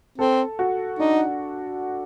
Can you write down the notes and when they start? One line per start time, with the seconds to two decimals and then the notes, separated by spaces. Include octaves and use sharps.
0.18 C4 A4
0.59 F#4
0.99 D4 D#4